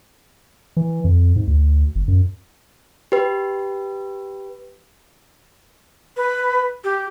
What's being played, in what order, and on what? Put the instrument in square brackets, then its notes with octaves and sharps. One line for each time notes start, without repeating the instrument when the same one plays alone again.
[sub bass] E3
F2
G#2
D2
G1
F#2
[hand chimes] G4 B4
[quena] B4
G4